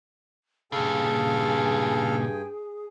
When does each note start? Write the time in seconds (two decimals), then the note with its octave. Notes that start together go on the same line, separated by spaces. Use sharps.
0.72 G2 A#2 C#3 G#4 A4 F5 G5 G#5